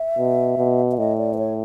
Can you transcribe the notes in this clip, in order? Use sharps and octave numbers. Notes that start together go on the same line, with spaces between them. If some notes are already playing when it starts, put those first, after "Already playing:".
Already playing: E5
B2
B2
E5
A2 D#5
D5
C5
C#5